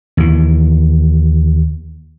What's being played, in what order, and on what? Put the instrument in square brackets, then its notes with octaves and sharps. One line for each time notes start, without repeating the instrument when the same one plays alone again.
[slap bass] D#2 E3